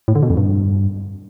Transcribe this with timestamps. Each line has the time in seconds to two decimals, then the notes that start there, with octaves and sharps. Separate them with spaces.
0.08 A2
0.15 D3
0.23 B2
0.30 F2
0.37 G2